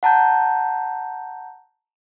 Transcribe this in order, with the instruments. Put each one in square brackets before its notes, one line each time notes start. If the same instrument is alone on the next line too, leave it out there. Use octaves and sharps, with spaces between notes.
[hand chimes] F#5 A5 A#5 G6